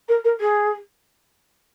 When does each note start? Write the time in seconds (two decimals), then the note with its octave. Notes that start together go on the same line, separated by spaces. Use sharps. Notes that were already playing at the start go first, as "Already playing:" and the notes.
0.08 A#4
0.24 A#4
0.40 G#4